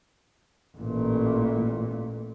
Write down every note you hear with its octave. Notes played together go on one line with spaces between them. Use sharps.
A1 A#2